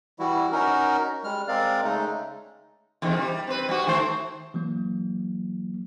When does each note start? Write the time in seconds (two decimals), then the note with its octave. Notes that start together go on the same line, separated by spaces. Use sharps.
0.19 E3 G3 E4 F#4
0.52 C#4 D#4 F#4 A#4
1.24 G3 G#3 F6
1.48 G#3 C4 A#4 D5 F5
1.84 C#3 G#3 A3 D#4
3.02 E2 C3 D#3
3.16 G3
3.47 C4 B4
3.69 G3 F#4
3.87 D#3 A3 C5
4.54 E3 F#3 A#3